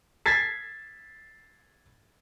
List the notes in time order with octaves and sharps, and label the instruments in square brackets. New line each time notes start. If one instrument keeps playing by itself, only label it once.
[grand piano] G#6 A6 B6 C7